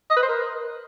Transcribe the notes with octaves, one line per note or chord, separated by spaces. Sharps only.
D#5
B4
C5
A#4